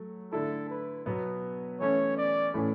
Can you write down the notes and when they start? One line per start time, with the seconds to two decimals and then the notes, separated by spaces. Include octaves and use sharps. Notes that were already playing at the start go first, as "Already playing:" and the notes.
Already playing: F#3 A3
0.32 D3 A3 E4 A4
0.69 B4
1.06 B2 F#3 B3
1.80 E3 A3 C#4 C#5
2.17 D5
2.54 A2 E3 A3 C#4 E4